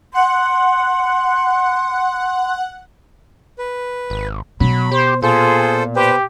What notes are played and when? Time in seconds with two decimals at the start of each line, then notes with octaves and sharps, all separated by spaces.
0.14 F#5 C6
3.58 B4
4.10 G#1
4.60 B2 F#3 B5
4.92 G4 C5
5.23 A#2 F4 G#4 A4 C5
5.96 G4 B4 C5